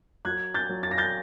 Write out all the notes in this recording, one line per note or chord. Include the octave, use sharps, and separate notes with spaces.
F#3 F#6 G#6
G6 A6
F#3
A6
A#6
G6 A6